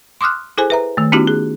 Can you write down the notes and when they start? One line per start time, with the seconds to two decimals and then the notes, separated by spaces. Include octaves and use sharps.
0.21 C6 D6 D#6 F6 F#6
0.58 E4 G#4 A4 C5 G#5
0.70 B4 E5 A#5
0.97 D#3 A3
1.12 B3 C#4 D#4 E4 F#4 G4
1.27 G#4